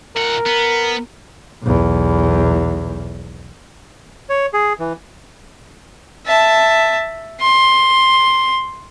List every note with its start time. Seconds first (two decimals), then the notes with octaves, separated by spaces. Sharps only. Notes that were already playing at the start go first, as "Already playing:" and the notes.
0.16 A#2 A#4 F#5
0.46 B3
1.63 B1 E2
4.29 C#5
4.53 G#4
4.79 E3
6.26 E5 A5
7.40 C6